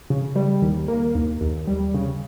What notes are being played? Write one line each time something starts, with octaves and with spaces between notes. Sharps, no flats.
C#3
G3
D#2
A#3
D#2
D#2
G3
C#3